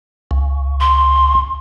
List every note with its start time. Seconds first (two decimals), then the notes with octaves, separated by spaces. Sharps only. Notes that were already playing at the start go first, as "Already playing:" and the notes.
0.31 C#2
0.80 C6